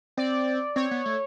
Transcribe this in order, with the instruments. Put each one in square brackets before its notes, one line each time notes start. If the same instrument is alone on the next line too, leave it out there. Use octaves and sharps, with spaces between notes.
[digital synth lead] C4 [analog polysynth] D5
[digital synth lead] C4 [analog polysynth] C#5
[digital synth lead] B3
A3